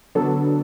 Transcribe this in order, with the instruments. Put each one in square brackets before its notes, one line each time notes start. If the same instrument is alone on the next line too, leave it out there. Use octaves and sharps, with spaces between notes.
[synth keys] D3 F#3 B3 D4 A4